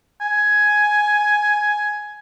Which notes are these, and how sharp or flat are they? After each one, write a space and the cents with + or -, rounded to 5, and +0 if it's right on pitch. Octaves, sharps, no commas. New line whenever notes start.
G#5 +10